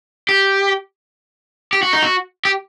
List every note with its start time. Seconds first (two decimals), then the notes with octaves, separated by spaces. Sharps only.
0.29 G4
1.73 G4
1.83 F#4
1.93 D#4
2.02 F#4
2.45 G4